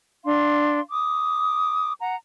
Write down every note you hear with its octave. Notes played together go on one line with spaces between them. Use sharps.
D4 F5 C6
D6 D#6
F#5 A#5